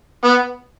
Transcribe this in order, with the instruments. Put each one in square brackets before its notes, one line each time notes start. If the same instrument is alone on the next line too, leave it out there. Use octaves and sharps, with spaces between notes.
[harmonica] B3